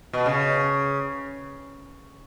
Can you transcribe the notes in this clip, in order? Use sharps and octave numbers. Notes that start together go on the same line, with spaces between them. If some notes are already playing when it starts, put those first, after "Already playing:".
B2
C#3